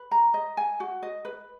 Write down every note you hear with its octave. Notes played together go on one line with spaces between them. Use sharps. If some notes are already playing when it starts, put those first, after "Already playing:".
Already playing: B4
A#5
D#5
G#5
F#4
D#5
B4